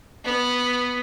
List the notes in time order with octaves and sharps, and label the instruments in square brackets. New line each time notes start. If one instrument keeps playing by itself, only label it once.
[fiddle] B3